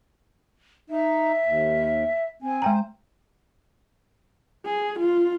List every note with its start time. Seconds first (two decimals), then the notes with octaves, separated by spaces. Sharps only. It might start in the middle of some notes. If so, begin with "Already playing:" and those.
0.90 D#4 E5
1.44 D#2
2.42 C4 G#5
2.62 G#3 C5 G5 A#5
4.65 G#4
4.99 F4